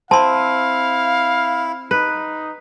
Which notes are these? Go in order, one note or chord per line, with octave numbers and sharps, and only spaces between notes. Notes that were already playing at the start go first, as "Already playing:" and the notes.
C4 E4 F5 A5 C6
D#4 B4